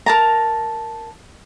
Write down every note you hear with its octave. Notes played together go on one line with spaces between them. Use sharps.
A#4 A5 A#5